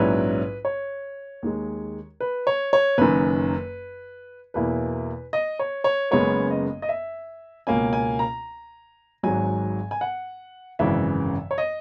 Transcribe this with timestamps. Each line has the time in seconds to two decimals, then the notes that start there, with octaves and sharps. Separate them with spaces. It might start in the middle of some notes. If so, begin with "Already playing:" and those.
Already playing: A#1 G#2 F#3 C#4 E4 B4
0.65 C#5
1.43 D#2 D#3 G#3
2.21 B4
2.47 C#5
2.73 C#5
2.98 F#1 F#2 D#3 B4
4.54 E2 B2 A#3 E4 B4
5.33 D#5
5.59 C#5
5.84 C#5
6.11 F#1 F#2 C#3 G#3 B3 C#5
6.51 D#5
6.82 D#5
6.89 E5
7.67 C#2 B2 A#3 C#4 G#5
7.93 G#5
8.19 A#5
9.23 G#1 G#2 F#3 G#5
9.91 G#5
10.01 F#5
10.79 G#1 F#2 C#3 E3 E5
11.51 C#5
11.58 D#5